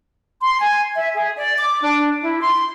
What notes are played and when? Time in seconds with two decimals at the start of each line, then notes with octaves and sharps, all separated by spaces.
0.42 C6
0.59 G#5
0.95 E5
1.15 G#4
1.36 D5
1.57 D6
1.82 D4
2.20 E4
2.41 C6